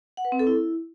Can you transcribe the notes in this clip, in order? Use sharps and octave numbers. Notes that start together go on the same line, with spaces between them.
F#5
B4
C4
A4
E4